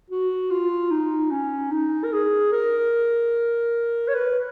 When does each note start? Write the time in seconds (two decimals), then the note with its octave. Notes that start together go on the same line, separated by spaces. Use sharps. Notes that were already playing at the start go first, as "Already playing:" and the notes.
0.10 F#4
0.50 F4
0.91 D#4
1.31 C#4
1.72 D#4
2.04 A#4
2.12 G#4
2.52 A#4
4.08 C#5
4.14 B4